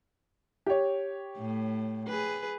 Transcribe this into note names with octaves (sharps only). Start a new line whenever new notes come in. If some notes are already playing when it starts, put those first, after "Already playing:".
G4 C#5
A2
G#4 B4